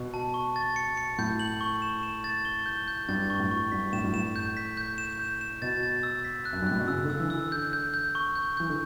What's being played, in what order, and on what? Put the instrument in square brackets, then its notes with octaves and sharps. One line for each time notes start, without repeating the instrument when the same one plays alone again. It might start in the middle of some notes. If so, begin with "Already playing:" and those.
Already playing: [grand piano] B2
[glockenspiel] A5
C#6
A6
C#7
C#7
[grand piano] A2 [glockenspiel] G6
[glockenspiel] F#7
C#6
E7
E7
A6
G7
G6
G6
[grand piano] G2 [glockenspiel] A6
[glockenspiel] C#6
[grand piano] A2
[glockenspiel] C#6
[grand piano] G2 [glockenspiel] B6
[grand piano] A2 [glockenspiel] E7
[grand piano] G2
[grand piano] A2 [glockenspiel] E7
[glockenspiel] G6
B6
G6
E7
G6
E7
[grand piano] B2 [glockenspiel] A6
[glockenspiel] A6
E6
B6
F#6
[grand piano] F#2
G2
[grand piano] A2 [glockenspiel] F#6
[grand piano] B2
[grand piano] C#3 [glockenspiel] E6
[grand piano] D3
[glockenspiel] E6
[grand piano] E3
[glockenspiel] E6
[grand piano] D3
[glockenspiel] G6
G6
G6
C#6
G6
[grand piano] E3 [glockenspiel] G6
[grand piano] D3